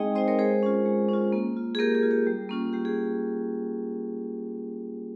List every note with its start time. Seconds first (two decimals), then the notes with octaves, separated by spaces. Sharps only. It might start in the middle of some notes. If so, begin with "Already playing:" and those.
Already playing: G#3 C4 D#4 G#4 D#5 G5
0.15 C4 D#4 C5 D#5
0.28 A#4 C#5
0.39 G#3 G#4 C5
0.63 C#4 F4
0.86 G#3
1.09 C#4 F4
1.32 A#3
1.56 F4
1.75 G#4
1.79 A#3 G4 A#4
1.95 G#4
2.03 F4
2.11 G4
2.27 G3
2.49 A#3 C#4 F4
2.73 G3 G4
2.85 G#4